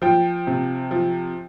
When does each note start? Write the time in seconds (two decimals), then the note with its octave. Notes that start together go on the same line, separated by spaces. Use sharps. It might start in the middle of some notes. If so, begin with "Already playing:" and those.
0.02 F3 G5
0.47 C3
0.91 F3